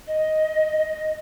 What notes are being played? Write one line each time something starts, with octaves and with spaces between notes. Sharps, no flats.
D#5